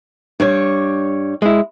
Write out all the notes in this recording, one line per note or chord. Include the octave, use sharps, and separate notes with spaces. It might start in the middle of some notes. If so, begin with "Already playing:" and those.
G2 G3 C#5
G#3 E4